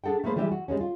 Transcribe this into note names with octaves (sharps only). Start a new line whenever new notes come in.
D4 G#4 A4 F#5 G5
A3 A#3 G#4 B4 C5
E3 G3 G#3 G4 D#5 E5
F#4
G3 G#3 A#3 C#4
F4